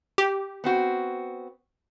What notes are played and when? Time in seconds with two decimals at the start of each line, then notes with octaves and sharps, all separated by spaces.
0.18 G4
0.64 B3 C4 F#4